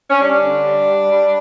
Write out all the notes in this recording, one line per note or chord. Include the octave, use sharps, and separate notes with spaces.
C#4
G3 D4
D3
G3
G3
G3